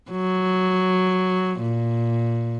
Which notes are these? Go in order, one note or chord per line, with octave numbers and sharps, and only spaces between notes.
F#3
A#2